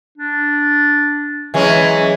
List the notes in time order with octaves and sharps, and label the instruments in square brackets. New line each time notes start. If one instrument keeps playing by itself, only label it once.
[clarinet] D4
[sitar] E3 G#3 C#4 [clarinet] F#3